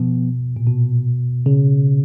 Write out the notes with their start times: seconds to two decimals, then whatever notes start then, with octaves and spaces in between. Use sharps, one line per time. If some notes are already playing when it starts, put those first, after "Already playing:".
Already playing: B2 F3 B3
0.56 A#2
0.67 B2
1.46 C#3